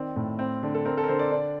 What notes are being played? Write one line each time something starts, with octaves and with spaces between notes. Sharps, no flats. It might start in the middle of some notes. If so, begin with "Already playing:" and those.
Already playing: D#3 C4 D5
A2
C4
D3
A4
C4 A#4
A4
A#4
D3 C5
D5
D4